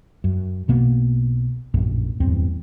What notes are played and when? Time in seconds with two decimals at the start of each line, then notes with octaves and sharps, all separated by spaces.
0.24 F#2
0.68 B1 B2 A#3 B3
1.74 A#1 F#2 A2
2.20 D1 E2 G2 C4